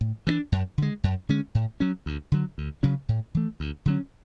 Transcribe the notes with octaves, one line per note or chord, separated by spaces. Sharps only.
A2
E3 B3 D4
F#2
D3 G#3
F#2
D3 G#3 C#4
A2
F#3 C#4
D2
D3 F#3
D2
C#3 F#3 C#4
A2
E3 A3
D2
D3 F#3 C#4